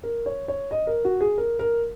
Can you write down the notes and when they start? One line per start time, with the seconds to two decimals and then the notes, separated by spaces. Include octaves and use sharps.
0.03 A#4
0.26 C#5
0.48 C#5
0.71 D#5
0.87 A#4
1.05 F#4
1.21 G#4
1.38 A#4
1.59 A#4